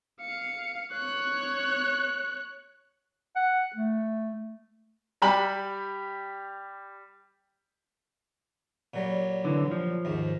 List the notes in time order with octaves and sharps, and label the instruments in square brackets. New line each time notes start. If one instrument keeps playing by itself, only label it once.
[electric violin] F5 C#7
C#5 F#6
[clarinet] F#5
A3
[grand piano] G3 G4 B5 F#7
[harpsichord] A#2 F#3 G3
[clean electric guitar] D3 E3
F3
[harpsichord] D#2 G#2